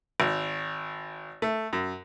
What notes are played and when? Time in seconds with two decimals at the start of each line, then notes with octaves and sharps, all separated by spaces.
0.20 G#1
1.42 A3
1.73 F#2